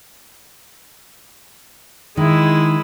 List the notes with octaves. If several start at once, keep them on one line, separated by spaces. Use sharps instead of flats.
D#3 G#3 E4